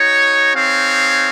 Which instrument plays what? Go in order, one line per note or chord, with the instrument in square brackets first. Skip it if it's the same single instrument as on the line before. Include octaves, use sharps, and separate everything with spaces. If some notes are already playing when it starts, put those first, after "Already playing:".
Already playing: [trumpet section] D#4 F#4 C#5
C4 D#4 G#4 C#5 F5